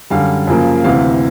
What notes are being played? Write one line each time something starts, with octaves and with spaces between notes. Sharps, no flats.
F#2 D3 G3 F5
F#2 C#3 F3 A#3
D2 C3 E3 F5